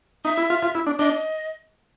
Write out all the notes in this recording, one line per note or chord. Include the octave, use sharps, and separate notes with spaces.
D#4 E5
E4
F4
F4
E4
D4
D4 D#5